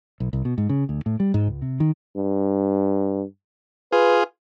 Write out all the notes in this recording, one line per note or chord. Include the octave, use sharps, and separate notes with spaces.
B1
C2
B2
G#2
C#3
D2
A2
G3
G#2
C#2
C3
D#3
G2
F4 G#4 B4